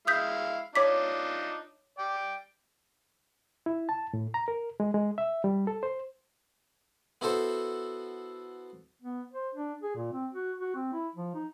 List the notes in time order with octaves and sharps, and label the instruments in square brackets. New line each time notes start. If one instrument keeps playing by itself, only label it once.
[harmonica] G#3 E4 F5 [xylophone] D#6 G6 B6
[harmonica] D4 D#4 F4 [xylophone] C#5 D6 B6
[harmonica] D5 G5
[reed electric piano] E4
A5
A2
A#5
A#4
G#3
G#3
E5
G3
A4
C5
[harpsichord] B3 E4 F#4 A4 C5
[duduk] B3
C5
D4
G#4
A#2
C4
F#4
F#4
C4
E4
F3
D#4